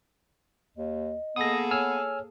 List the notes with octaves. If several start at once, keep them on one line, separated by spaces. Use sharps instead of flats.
D#2 D#5
A#3 B3 G#4 A4 D#6 A#6
C#5 G#5 E6 F6